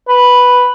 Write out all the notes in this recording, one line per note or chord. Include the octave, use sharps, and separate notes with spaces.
B4